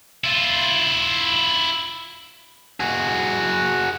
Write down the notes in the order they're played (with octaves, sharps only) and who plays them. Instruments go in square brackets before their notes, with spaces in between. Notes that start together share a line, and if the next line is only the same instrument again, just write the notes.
[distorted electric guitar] E4 F4
[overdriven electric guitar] F#4 G#4